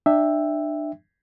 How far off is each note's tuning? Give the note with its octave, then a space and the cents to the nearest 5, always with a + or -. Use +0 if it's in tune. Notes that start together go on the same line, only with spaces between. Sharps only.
D4 +30 E5 +0 G5 +20